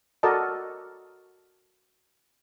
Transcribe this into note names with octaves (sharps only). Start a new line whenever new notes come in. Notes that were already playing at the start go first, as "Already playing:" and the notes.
F#4 A4 A#4 D5 D#5 A5